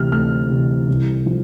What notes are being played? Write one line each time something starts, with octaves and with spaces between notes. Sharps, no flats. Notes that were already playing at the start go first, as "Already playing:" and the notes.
Already playing: D2 C3 E3 F6
D2 F6
C3 E3
C2
F3